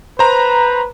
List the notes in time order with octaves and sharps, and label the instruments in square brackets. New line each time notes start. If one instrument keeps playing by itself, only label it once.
[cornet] B4 [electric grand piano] C5 A#5